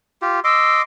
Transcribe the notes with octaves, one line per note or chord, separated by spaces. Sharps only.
F4 G4
D#5 C6 D6 E6